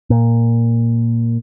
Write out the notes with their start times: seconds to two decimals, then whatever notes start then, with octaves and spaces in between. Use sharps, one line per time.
0.10 A#2